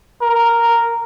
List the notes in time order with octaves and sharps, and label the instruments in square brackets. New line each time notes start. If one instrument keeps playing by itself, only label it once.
[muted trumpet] A#4